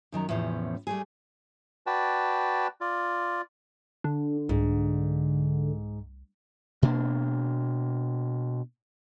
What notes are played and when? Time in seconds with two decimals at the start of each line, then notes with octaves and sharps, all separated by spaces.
0.12 F#2 D#3 F#3 A#5
0.29 E2 A2 C3 F3 C#4
0.87 G3 A3 G#4
1.87 F#4 B4 D5 G5 A5
2.81 F4 D5
4.04 D3 D4
4.49 C2 G#2
6.83 B2 A#3 D4